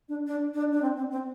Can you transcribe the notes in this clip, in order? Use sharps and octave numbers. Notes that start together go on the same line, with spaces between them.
D4
D4
D4
D4
C4
C4
C4